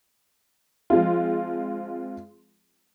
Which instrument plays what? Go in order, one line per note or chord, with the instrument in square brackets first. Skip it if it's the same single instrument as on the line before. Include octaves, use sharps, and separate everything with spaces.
[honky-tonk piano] F3 G#3 C4 F4